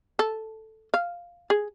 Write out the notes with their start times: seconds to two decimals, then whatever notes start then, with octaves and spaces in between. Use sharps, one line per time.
0.19 A4
0.94 F5
1.50 G#4